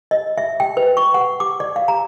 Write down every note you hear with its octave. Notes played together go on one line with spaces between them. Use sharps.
D#5
E5
G5
B4
C#6
F#5
D6
D5
F5
A#5